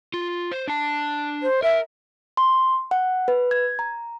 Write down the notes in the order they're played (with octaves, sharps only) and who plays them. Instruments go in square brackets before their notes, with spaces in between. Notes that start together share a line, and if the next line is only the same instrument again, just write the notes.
[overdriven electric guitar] F4
C5
D4 A5
[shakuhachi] C5
[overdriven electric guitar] A#4 [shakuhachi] E5
[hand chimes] C6
F#5
B4
G#6
A#5